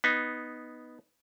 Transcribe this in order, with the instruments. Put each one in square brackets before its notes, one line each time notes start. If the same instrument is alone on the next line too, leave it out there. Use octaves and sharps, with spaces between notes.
[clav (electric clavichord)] B3 D#4